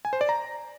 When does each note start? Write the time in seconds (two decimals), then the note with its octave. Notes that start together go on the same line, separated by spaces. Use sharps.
0.05 G#5
0.13 C5
0.21 D5
0.29 A#5